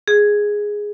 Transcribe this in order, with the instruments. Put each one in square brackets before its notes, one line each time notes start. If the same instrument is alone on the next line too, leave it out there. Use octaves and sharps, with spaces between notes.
[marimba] G#4